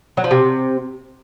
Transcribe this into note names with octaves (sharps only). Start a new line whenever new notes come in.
F#3
F3
C3